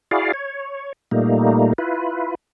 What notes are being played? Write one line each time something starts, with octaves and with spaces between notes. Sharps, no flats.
E4 F#4 G#4 D5 F5
C#5
A#2 G3 A3 A#3 D#4
E4 F4 B4